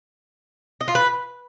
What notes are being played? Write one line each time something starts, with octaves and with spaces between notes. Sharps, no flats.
D#5
F4
B4